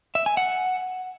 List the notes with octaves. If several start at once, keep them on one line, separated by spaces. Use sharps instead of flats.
E5
G#5
F#5